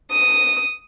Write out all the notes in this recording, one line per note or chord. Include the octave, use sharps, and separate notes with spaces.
D#6